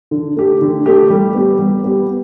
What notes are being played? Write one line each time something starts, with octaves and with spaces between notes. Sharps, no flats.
D3
A3 G4
D3
A3 G4
G3
B3 G4
G3
B3 G4